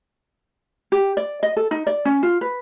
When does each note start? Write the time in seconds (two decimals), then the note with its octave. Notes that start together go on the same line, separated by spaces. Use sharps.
0.92 G4
1.17 D5
1.43 D#5
1.56 A4
1.71 D#4
1.87 D5
2.05 C#4
2.23 F4
2.41 B4